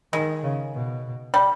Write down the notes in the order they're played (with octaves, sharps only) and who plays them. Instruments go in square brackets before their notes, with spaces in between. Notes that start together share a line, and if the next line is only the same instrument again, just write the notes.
[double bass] D#3 [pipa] G#3
[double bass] C#3
B2
[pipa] G3